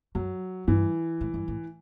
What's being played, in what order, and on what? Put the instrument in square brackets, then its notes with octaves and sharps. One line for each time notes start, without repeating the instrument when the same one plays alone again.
[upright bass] F#2 [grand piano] F#3
[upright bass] G2 [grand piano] E3
[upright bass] A2
G2
A2